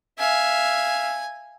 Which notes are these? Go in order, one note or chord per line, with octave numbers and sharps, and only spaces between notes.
E5 F5 G#5